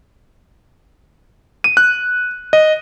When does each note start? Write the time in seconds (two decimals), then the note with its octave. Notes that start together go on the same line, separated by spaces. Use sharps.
1.64 D#7
1.77 F#6
2.53 D#5